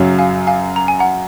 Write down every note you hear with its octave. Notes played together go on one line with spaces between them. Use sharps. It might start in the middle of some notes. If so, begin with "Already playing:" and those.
Already playing: F#2 C#3 F#3
F5 G#5
F5 G#5
A#5
G#5
F#5 A#5